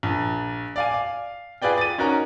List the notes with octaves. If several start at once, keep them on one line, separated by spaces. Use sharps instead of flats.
A#1
D5 F5 G#5
F5
F4 G#4 B4 D5 G5
A6 D#7
C#4 D#4 F#4 A#4 A#5